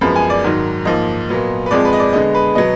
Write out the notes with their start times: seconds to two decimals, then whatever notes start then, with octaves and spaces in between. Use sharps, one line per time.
0.01 F#2 F3 G#3 B3 B5
0.16 G#5
0.30 D5
0.44 G#2 D#3 F#3
0.85 G#2 F3 A#3 D#5
1.29 A#2 F#3 B3
1.66 B4
1.71 F2 F3 G#3 D5
1.85 B4
1.93 D#5
1.99 D5
2.13 D3 G#3 B3 D#5
2.35 B4
2.55 B2 F#3 B3 D#5